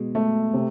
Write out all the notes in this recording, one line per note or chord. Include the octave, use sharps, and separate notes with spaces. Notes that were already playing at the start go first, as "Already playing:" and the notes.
Already playing: B2 G#3
A3
C3